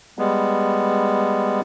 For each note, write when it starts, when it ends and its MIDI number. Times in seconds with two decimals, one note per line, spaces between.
0.19 1.61 55
0.19 1.61 56
0.19 1.61 59